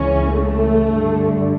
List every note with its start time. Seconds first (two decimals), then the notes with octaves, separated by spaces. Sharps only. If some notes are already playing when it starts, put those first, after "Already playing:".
Already playing: C#2 C#3 E3 C#4
0.33 A3
0.86 G2 D3